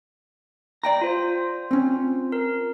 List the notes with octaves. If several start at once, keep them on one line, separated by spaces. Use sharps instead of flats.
D5 G5 A#5
F4 C5
C4 C#4
A#4